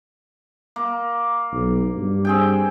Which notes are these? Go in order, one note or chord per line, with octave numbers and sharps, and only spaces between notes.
A#3
B1
G2
C4 G#4 G5